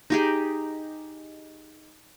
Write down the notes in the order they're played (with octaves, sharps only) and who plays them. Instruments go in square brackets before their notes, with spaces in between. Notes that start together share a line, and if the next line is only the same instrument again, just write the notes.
[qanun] D#4 G4 G#4